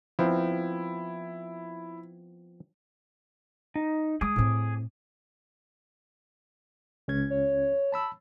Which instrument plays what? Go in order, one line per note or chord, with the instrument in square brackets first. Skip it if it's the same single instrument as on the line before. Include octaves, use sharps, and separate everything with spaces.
[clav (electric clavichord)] F3 B3 C4 [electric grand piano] E4
[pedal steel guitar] D#4
[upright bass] G#3 [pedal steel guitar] G#4 D6 D#6
[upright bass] A2 C4
[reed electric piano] C#2 C#4 G#6
[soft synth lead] C#5
[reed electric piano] A5 B5 E6